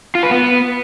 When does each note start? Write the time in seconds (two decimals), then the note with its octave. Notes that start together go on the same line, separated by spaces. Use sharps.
0.15 F4
0.23 B4
0.31 B3